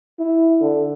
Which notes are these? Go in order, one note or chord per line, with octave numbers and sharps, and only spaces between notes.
E4
D3